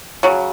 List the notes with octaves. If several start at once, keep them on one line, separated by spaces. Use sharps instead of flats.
C#3 F#3